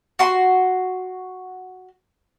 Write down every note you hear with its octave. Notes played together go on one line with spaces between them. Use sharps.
F#4 C6